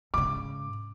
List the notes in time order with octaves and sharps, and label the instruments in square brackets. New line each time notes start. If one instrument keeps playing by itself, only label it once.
[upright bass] G#2 C#3 [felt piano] D6